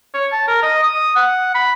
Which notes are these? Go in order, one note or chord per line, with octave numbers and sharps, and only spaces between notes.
C#5
A5
A#4
D#5
D#6
F#5
B5